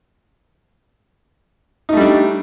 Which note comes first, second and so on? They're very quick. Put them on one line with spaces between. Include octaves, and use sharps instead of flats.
D#4 A3 G3 D4